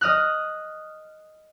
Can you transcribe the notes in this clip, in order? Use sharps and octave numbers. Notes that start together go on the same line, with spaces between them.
D#5 D#6 F6 F#6